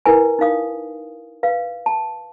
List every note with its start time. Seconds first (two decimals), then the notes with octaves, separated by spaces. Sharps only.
0.06 E4 A#4 B4 G#5
0.39 D#4 A#4 F5 D#6
1.43 B4 F5
1.86 A5